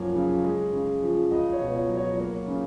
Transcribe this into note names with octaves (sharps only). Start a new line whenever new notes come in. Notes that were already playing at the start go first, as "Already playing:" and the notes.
Already playing: F#2 F3 A#3 C#5
C#3
G#3
C#3
F3
C#2 D#5
C#5
B2
C#5
F#3
C#5
A#3 C#5
C#3